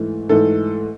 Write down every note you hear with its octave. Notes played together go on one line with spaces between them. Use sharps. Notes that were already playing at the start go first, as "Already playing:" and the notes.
Already playing: G#2 E3 A3
G#2 E3 A3 A4